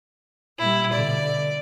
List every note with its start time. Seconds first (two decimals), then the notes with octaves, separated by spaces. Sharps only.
0.58 A#2 G3 E4
0.93 B2 D3 D5